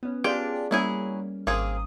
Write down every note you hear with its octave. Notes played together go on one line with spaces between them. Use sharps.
B3 C#4
D4 F4 G4 G#4 D5 G5
F#3 G3 A#3 C#4 E4 G#4
G#1 A#3 C4 G#4 D#6